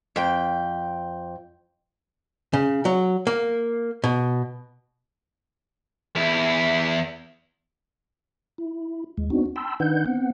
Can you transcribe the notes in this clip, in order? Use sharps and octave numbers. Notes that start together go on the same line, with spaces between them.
F2 G5
C#3
F#3
A#3
B2
E2 E4
E4
D#2 G#3
B3 C4 D4 D#4 F#4
G5 A5 B5 C6 E6
D#3 D4 D#4 B4 F#5 G6
B3 C4 F#5